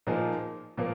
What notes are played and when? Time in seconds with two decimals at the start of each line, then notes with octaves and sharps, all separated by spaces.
0.07 A#2 F3 A#3 D#4 G#4
0.77 A#2 F3 A#3